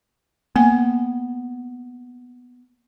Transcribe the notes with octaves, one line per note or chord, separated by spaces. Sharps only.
A#3 B3 G5 G#5